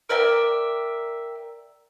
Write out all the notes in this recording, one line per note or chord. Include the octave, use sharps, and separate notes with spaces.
A#4 D5 E5 G5